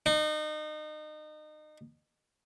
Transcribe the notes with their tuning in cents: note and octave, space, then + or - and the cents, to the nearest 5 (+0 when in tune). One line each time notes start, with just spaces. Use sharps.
D#4 -30